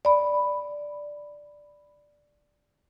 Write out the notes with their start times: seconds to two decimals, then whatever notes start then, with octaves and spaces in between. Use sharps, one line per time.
0.05 D5 B5